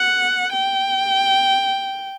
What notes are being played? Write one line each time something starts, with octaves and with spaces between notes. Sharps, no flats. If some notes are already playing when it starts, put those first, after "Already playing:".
Already playing: F#5
G5